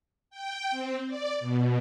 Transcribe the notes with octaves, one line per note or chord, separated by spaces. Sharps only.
G5
C4
D5
B2